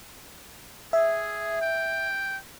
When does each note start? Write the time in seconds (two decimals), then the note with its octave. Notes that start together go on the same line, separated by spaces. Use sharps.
0.93 G#4 E5
1.61 G5